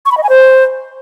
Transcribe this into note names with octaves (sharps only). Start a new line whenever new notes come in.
C#6
B5
D#5
G#5
C5